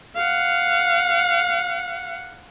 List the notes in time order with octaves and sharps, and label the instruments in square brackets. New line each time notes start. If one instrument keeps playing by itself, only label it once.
[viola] F5 F#5